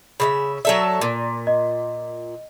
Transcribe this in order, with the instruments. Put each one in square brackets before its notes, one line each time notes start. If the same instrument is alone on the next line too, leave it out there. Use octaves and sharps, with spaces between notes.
[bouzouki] C#3 A4 E5 [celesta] B5
[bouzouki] F#3 A4 E5 [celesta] D5
[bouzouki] A#2
[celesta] D#5